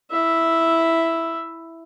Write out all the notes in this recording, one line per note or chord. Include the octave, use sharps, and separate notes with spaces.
E4 E5